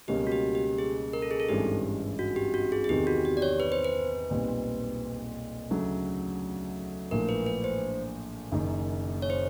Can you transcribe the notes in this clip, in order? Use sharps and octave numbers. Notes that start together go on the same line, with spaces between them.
C#2 B2 G3 A#3 C#4 G4
F#4
G4
G4
G#4
A#4
A4
G#4
A4
G#1 G2 E3 G#3 C#4 G4
F#4
G4
F#4
G#4
G#4
E2 C3 D#3 G4
F#4
G4
D5
C#5
B4
C5
B4
B1 A#2 G3 C4
D2 C#3 F#3 A3
A#1 A2 F3 A#3 A#4
B4
B4
C5
F#1 F#2 D#3
C#5
C5